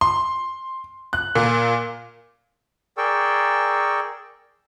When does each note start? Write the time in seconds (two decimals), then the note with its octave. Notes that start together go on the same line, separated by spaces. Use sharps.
0.01 C6
1.13 F#6
1.35 A#2
2.97 G#4 A#4 D5 G5 C#6 E6